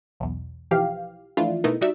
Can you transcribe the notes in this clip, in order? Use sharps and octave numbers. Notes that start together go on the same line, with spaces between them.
B1 E2
B1 E3 F3 G4 F5
E3 F3 A3 D4 E4 F4
B2 A3 B3 D#4 E4 A#4
G3 D#4 F#4 D5 E5